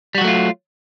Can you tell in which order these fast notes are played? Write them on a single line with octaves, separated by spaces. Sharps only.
G3 F#4 F#3 A3 F4